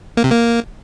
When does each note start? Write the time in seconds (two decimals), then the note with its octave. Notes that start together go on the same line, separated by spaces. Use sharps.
0.17 A#3
0.24 C3
0.31 A#3